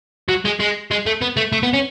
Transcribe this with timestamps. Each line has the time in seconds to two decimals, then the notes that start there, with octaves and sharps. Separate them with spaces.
0.29 F#3
0.45 G#3
0.60 G#3
0.91 G#3
1.07 A3
1.22 B3
1.37 A3
1.52 A3
1.63 B3
1.74 C#4